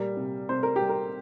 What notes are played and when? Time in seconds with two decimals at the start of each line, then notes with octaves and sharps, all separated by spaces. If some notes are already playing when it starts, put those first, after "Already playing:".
Already playing: A#2 G3 A#4
0.17 C3
0.49 C3 C5
0.63 A#4
0.76 G4
0.81 G3
0.89 A#4